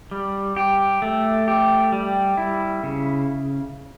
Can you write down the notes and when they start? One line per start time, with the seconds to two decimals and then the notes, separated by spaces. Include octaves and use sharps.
0.11 G3
0.56 G4
1.02 A3
1.48 G4
1.92 G3
2.37 E4
2.84 C#3